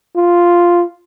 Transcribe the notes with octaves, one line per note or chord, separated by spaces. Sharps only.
F4